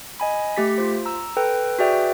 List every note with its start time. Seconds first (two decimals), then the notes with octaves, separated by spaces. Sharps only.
0.20 D#5 G#5 B5
0.57 A3 G4 B6
0.78 F4 C5
1.05 A#5 E6
1.37 A4 B4 G5
1.79 F#4 G#4 B4 D5 E5 G5